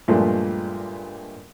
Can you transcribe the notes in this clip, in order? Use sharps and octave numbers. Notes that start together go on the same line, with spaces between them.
G2 A#2 F3 G#3 A3